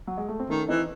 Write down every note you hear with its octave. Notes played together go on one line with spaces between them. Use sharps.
F#3
G#3
A3
C4
D#3 A3 C#4
E3 C4 D#4